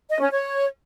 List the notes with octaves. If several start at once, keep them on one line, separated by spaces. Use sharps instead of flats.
D#5
C#4
C#5